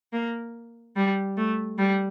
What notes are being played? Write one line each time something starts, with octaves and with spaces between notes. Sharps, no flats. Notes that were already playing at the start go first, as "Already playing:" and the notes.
A#3
G3
A3
G3